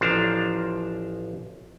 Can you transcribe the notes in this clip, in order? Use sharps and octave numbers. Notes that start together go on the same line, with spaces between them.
A1 F3 D4 F5 A5 A#5